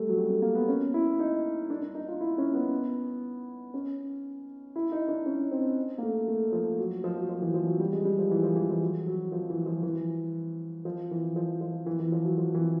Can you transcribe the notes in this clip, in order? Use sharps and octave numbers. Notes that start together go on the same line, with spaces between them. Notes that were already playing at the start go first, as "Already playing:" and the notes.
Already playing: G3 A3
F#3
G3
A3
A#3
B3
C#4
E4
D#4
D4
D4
D#4
F4
E4
C#4
B3
C#4
E4
D#4
D4
C#4
C4
A#3
A3
A3
F3
F#3
F3
F#3
F3
E3
F#3
F3
F#3
G3
G#3
G3
F3
E3
F3
E3
F3
F#3
F#3
F3
E3
F3
E3
F3
E3
F3
F3
E3
E3
F3
F#3
F3
E3